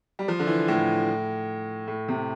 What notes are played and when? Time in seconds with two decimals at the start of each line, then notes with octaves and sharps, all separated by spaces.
0.19 G3
0.28 F3
0.39 D3
0.47 E3
0.68 A2
1.88 A2
2.08 C3